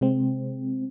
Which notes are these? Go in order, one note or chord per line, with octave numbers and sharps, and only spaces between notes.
C3 G#3 C4